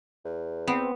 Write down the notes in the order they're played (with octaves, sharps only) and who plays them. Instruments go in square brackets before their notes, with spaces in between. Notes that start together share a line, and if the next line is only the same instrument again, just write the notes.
[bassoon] E2
[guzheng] B3 [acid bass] C4